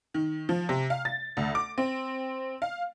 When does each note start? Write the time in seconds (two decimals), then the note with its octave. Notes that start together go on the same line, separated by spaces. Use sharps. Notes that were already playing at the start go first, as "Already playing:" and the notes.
0.14 D#3
0.49 F3
0.69 C3
0.90 F5
1.05 A6
1.37 D2
1.55 D6
1.78 C4
2.62 F5